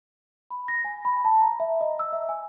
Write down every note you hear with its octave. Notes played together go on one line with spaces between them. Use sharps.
B5
A#6
G#5
B5
A5
A#5
E5
D#5
E6
E5
G#5